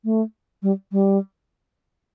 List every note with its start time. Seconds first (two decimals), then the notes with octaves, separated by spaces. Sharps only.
0.05 A3
0.63 G3
0.92 G3